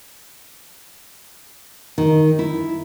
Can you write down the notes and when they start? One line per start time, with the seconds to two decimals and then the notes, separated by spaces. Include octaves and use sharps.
1.98 D#3
2.39 E4